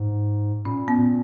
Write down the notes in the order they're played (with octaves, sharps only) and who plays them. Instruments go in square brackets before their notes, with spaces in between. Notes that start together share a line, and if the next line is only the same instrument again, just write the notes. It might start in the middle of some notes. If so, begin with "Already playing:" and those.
Already playing: [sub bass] G#2
[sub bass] A#2 [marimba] C#4
[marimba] B3
[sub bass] A#2